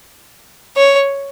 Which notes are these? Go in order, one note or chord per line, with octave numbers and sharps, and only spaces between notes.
C#5